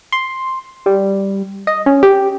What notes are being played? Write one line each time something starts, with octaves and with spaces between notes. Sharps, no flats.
C6
G3
D#5
C#4
G4